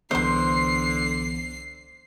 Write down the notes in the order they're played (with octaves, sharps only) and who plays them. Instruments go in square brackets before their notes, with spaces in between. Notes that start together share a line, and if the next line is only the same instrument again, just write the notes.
[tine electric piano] C2 E3 B3 [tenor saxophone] D3 [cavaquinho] C5 C6 [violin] C7